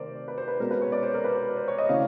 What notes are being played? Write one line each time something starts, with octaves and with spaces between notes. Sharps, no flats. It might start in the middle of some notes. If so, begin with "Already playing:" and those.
Already playing: C3 D#3 A3 A#4 C5 D5
B4
C5
B4
B2 G#3 C#4 A#4
B4
C#5
D5
C5
A#4
B4
C5
C5
C#5
D#5
C#3 E3 A3 F5